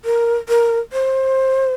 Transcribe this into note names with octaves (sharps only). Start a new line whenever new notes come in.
A#4
A#4
C5